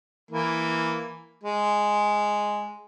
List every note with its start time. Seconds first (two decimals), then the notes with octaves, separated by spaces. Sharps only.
0.31 E3 A#3
1.43 G#3